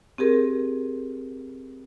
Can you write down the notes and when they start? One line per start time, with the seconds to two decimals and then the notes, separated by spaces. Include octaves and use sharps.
0.18 C4 G4 G#4 A#4